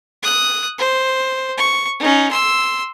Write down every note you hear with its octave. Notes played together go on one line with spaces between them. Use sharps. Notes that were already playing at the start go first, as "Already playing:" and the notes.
D#6 F#6
C5
C#6
C#4 D#4
C6 E6